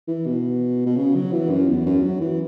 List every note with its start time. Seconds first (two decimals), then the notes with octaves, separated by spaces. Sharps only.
0.08 E3
0.26 B2
0.86 B2
0.97 C#3
1.15 F#3
1.33 E3
1.50 F#2
1.68 E2
1.86 F#2
2.03 F#3
2.21 E3